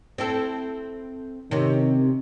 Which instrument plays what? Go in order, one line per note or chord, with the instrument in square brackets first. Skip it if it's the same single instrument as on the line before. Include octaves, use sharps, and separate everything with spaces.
[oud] C4 E4 A4
[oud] C3 C#4 [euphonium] D#3